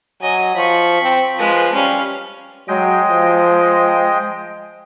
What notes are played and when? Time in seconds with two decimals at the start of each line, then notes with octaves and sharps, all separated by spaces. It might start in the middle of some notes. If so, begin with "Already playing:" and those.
0.21 F#3 D#5 G#5
0.55 F3 B5 C#6
1.02 C4
1.36 F3 G#3 B4
1.75 G3 C#4 F5
2.68 F#3 G#3 D#5 G5
3.10 F3